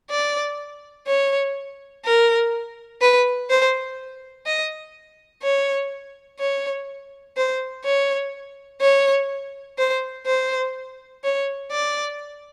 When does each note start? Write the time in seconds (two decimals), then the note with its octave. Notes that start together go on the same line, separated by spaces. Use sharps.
0.10 D5
1.07 C#5
2.05 A#4
3.01 B4
3.50 C5
4.46 D#5
5.43 C#5
6.39 C#5
7.37 C5
7.85 C#5
8.81 C#5
9.78 C5
10.26 C5
11.24 C#5
11.71 D5